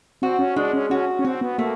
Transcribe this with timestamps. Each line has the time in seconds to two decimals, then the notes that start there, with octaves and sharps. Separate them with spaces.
0.22 C4 F#4
0.39 C#4
0.56 G#3 D4
0.74 C#4
0.90 C#4 F#4
1.19 C#4
1.25 C4 F#4
1.41 B3
1.58 A3 A#3